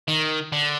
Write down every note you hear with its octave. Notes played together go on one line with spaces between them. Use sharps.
D#3
D3